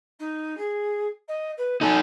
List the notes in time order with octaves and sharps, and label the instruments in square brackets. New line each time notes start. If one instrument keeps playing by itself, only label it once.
[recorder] D#4
G#4
D#5
B4
[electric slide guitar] D#4 A4 [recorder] G#5